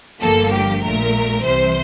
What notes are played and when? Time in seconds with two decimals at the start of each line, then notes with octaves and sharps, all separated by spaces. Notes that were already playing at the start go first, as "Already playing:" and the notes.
0.20 G1 G2 D3 F3 A#3 A4
0.51 G4
0.82 A#1 A#2 A3 A#4
1.42 C2 C3 E3 C5